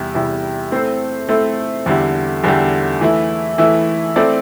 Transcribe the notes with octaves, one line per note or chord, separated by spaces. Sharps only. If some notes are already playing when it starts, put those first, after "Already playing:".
Already playing: E2 C3 G3 E4
E2 C3 G3 E4
A3 C4 E4 A4 C5
A3 C4 E4 A4 C5
E2 D3 G3 E4 G4
E2 D3 G3 E4 G4
E3 A3 E4
E3 A3 E4
A3 C4 E4 A4 D5